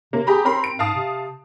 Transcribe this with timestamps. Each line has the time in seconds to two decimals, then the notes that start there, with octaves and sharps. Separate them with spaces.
0.13 C3 A#3
0.27 G4 G#4 A#5 B5
0.45 C4 A#4 B5 C6
0.64 D7
0.79 G#2 F5 A5 D#6
0.95 C3